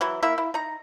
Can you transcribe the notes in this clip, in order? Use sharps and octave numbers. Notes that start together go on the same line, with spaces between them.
E3 F#3 E4
A#3 E4 E5
E4
D#4 A#5